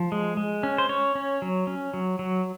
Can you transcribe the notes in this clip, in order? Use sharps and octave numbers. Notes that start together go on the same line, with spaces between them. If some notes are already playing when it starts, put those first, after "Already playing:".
Already playing: F3
G#3
G#3
C#4
C5
C#4 C#5
C#4
F#3
C#4
F#3
F#3